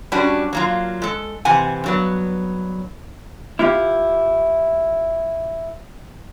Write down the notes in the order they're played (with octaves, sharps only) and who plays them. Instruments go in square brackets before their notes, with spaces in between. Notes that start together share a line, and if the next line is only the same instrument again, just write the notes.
[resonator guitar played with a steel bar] G3 C#4 D4 F#4
F#3 A#3 F4
G#3 A4
C3 E3 F#5 G#5
G2 F#3 B3
[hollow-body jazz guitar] E4 F4 G4